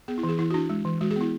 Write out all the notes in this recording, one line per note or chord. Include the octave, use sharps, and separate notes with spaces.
B3 G#4
E4
E3
G#4
E3 E4
F#4
D4 E4
G#3
E3
G#3 F#4
G#4
B3 E4